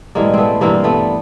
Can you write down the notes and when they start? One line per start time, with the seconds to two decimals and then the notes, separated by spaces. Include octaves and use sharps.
0.15 A2 E3 G3 G#3 A#3
0.34 A3 B3 C4
0.61 G2 E3 G3 A#3 C4
0.84 A3 B3